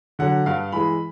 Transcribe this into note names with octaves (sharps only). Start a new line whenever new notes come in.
D3 F#3 F#5
G2 F5
E3 G#3 B5